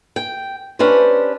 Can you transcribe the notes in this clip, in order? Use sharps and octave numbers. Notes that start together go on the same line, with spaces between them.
G5
C#4 D4 G4 B4 C5